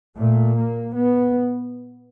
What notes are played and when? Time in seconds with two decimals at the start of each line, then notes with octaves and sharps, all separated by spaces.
0.17 A#2 A3
0.56 A#3
0.95 B3